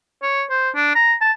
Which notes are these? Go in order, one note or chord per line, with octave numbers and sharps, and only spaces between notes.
C#5
C5
D4
A#5
A5